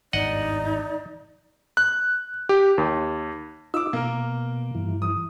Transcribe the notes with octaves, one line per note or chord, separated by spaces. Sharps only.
G#1 E2 G2 D#4 D5 D#5 F#5
F#6
G4
D#2
D#4 F4 D6 E6
B2 A#3 A#4
G2 E3
D#6